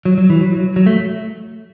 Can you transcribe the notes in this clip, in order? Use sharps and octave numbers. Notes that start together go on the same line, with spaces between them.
F#3
F#3
E3
F#3
F#3
F#3
A3